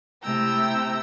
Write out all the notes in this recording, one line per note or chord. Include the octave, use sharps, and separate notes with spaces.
C3 A3 E4 G5 A#5 E6